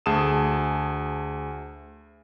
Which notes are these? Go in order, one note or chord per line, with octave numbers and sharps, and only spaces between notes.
D2 G#4 A5 D#6 E7